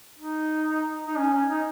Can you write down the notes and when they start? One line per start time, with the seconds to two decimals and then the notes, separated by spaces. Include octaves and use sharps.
0.18 D#4
1.07 D#4
1.17 C#4
1.33 C#4
1.50 D#4